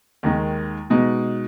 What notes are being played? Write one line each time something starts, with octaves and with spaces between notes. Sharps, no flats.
D#2 D#3 G#3
B2 G#3 D#4